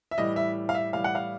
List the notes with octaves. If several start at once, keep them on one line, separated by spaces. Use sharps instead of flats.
E5
A2 E3 G3 D#5
E5
F5
E5
A2 E3 G3 F5
F#5
F5